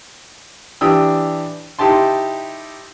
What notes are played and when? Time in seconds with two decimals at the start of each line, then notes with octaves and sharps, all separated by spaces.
0.81 E3 D4 G4 D#6 E6
1.79 D#4 E4 G4 A5 C6